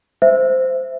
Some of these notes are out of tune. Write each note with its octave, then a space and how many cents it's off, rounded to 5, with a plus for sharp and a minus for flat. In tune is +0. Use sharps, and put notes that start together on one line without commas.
C5 -15 E5 +15